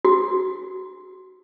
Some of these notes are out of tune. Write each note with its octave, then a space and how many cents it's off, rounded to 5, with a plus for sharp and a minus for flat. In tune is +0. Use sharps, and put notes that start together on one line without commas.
F#4 +20